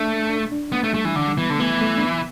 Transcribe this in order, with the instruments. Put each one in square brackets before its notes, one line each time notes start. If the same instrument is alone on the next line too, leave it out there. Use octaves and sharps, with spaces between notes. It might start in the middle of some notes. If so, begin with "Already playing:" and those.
Already playing: [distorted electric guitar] A3 [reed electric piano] D4
[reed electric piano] D4
D4
[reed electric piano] A3 [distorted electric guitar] B3
[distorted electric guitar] A3
[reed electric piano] G3 [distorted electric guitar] A3
[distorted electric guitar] E3
[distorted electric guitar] D3 [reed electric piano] E3
[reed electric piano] G3
[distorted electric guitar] E3 [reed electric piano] B3
[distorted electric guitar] D3 [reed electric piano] A3
[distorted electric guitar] E3 [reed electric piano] B3
[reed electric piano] A3
D4
B3